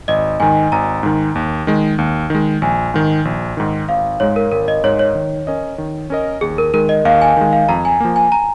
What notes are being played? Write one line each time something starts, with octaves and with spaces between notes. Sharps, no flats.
G#1 D#5
G#2 D#3 G#5
G#1 A#5
G#2 D#3
D#2
D#3 G#3
D#2
D#3 G#3
A#1 G#5
G#2 D#3
A#1
G#2 D#3
G#1 F5
G#2 G#3 C#5
A#4
G#1 A#4
D#5
G#2 G#3 C#5
C#5
D#3
C#4 A#4 D#5
D#3
C#4 A#4 D#5
D#2 G#4
A#4
D#3 G#3 A#4
D#5
D#2 F5
G#5
D#3 G#3
F5
F2 A#5
G#5
F3 A#3
G#5
A#5